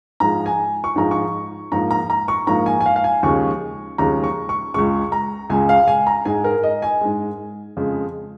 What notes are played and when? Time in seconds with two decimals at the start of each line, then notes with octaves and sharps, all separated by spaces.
0.20 G#2 F3 G#3 A#5
0.46 G#5
0.84 C#6
0.96 G#2 F3 G#3 A#5
1.11 C#6
1.72 G#2 F3 A#3 A#5
1.91 A#5
2.10 A#5
2.28 C#6
2.47 G#2 F3 A#3 A#5
2.66 G#5
2.81 G#5
2.86 F5
2.96 F5
3.04 G#5
3.23 D#2 C#3 F3 G#3 C#6
3.98 D#2 C#3 F3 G#3 A#5
4.24 C#6
4.49 C#6
4.74 C#2 C#3 G#3 C#6
5.12 A#5
5.50 C#2 C#3 G#3 G#5
5.69 F5
5.88 G#5
6.07 A#5
6.25 G#2 G#3 G#5
6.44 A#4
6.63 D#5
6.82 G#5
7.01 G#2 G#3
7.77 F2 C#3 G#3